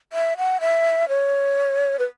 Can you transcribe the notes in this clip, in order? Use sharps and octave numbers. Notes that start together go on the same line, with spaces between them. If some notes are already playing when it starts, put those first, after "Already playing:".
E5
F#5
E5
C#5
B4